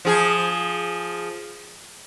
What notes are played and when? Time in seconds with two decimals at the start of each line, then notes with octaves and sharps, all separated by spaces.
0.05 F3 G#4